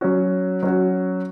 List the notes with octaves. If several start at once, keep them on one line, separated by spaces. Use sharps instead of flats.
F#3 C#4 F#4
F#3 C#4 F#4